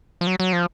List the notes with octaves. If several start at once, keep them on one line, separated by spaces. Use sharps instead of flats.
F3
F#3
F#3
F3